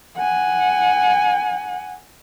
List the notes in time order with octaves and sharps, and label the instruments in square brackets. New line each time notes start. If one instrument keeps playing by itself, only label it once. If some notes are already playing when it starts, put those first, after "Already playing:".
[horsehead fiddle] F#5 G#5